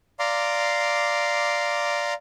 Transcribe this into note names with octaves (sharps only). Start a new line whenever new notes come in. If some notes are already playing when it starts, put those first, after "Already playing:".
D5 F5 A#5 C6 D6